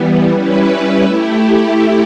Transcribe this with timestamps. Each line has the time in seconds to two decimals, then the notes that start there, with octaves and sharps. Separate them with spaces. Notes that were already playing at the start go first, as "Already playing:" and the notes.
Already playing: E3 G3 B3
0.32 G3 C#4 E4 B4
1.04 A3 E4 G4